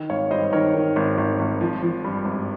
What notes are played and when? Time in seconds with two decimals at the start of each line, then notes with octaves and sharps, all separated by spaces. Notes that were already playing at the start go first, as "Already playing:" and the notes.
Already playing: D#3
0.10 G#1 C#5 F5
0.31 G2 C5 D#5
0.53 D#3 A#4 C#5
0.74 D#3
0.96 G#1
1.18 G#1
1.39 G#1
1.61 F3
1.82 F3
2.04 G2
2.25 G#1